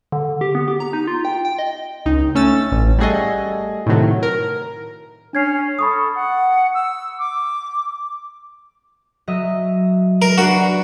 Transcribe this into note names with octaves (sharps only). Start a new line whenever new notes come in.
D3
G4
B3
G4
A#5
D#4
F4
G5
G5
D#5
C#2 D#4
A3 C#4 E6 A6
A1
G3 A3 F#4 G#4 A4 D#5
A2 C3 D#3 F#3 A3
A#4
C#4 D4 G#6 C7
A4 B5 C#6 D#6
F#5
E6
D6
F#3 D#5 E5
A#4
D4 F#4 B4 C7